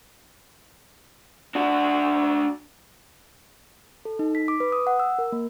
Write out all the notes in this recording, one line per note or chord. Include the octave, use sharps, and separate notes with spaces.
D4 F#4
A4
D#4
B6
D6
B4
D#6
F#5
E6
A#4
A#3